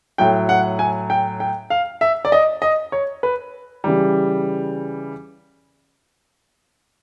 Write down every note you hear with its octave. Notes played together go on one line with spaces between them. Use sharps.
A2 F#3 G5
F#5
G#5
G5
G5
F5
E5
D5
D#5
D#5
C#5
B4
C#3 E3 G3